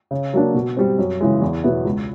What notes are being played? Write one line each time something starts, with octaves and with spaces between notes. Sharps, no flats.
C#3
F#3 A#3 D4
B2
G3 C4
F#2
C#3 E3 G#3
E2
B2 F#3 B3 E4
C#2